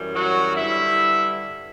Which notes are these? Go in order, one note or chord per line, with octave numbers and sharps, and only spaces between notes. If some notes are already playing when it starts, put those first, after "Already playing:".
Already playing: F#2 E3 G3
F#3 F#4
G2 D3 G3 E4 E5